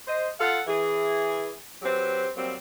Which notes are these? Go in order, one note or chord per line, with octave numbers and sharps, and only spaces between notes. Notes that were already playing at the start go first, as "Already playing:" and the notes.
C5 D#5
F4 A4 F5 F#5
E3 G#4
F#3 C4 G4 B4 C5
F#3 G3 A#3 C4